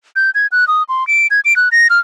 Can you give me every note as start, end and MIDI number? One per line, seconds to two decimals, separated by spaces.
0.16 0.30 91
0.35 0.47 92
0.52 0.67 90
0.68 0.83 87
0.89 1.06 84
1.07 1.27 98
1.31 1.40 92
1.45 1.56 98
1.56 1.69 90
1.72 1.87 94
1.90 1.99 89